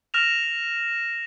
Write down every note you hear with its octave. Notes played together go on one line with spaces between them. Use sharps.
F6 A#6 E7 F7